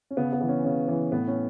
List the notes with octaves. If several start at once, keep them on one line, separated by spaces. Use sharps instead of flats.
C#4
C#3 B3
B3
E3
C#4
C#3 C#4
E3
A2 B3
C#4